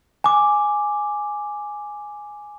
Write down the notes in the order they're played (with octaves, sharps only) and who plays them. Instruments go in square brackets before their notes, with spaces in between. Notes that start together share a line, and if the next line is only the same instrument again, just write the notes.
[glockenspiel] G#5 D6